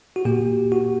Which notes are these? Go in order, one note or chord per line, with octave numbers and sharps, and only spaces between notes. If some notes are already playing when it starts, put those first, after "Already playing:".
F#4
A#2 A#3 G4
F#4